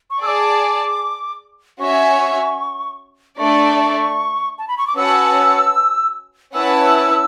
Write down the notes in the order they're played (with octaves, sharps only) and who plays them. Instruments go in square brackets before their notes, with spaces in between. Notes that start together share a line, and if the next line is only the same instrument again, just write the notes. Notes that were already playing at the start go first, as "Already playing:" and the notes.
[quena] C#6
[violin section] G#4 D5 A5 [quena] D6 E6
[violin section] C#4 F#4 C#5 E5 G#5 [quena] C#6
[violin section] A3 D4 A4 D5 [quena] C#6
[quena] A5
B5
C#6
D6
[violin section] C#4 F#4 B4 F#5 A5 [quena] E6
[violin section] C#4 E4 B4 F#5 A5 [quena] E6